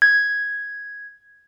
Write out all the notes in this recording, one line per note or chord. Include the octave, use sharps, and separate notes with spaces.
G#6